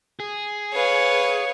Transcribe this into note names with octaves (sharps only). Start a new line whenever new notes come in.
G#4
B4 C#5 F5